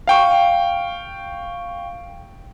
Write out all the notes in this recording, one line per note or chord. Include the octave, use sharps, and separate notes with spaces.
F5 G5 C#6